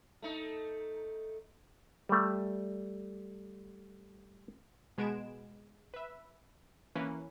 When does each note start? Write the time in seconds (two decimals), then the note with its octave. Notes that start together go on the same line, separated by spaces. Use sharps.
0.22 A3 D#4
2.09 G3 A3
4.98 B2 G#3 B3 G#6 D7 E7
5.94 B4 E5
6.95 E3 A#3 C#4 B4